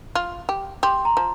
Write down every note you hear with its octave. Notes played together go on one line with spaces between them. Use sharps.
F4
G4
G4 C6
A#5
F3